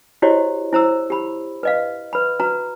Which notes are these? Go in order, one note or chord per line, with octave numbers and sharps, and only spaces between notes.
E4 F#4 G4 C5 C#5 D#5
E4 C5 A#5 E6
G4 B5
B4 D#5 F5
B4 B5
F#4 B4 A#5